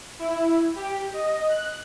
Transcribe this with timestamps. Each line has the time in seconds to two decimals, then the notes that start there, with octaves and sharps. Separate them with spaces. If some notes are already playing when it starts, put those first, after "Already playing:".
0.19 E4
0.75 G4
1.13 D#5
1.49 F#6